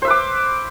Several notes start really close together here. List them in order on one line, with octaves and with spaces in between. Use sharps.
C5 E5 B4 D6